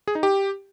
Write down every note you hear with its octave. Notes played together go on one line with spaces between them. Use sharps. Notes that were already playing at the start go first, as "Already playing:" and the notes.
G#4
D#4
G4